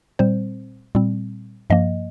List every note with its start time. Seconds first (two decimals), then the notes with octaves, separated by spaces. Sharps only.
0.19 A#2 G3 C4 C5
0.95 A#2 G3 C4
1.70 G2 F3 A#3 D#5